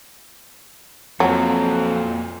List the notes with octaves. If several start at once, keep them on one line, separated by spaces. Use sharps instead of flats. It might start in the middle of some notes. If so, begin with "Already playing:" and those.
F2 F#3 A#3 F4 F#4